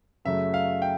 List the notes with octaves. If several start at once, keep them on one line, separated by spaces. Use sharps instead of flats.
F#2 C#3 F#3 A3 E5
F5
G5